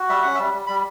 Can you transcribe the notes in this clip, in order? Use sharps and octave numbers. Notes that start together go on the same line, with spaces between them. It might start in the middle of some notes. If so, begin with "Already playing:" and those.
Already playing: F#4
G3 E5
C#4 F#5
E5
G3
G3
G3 B5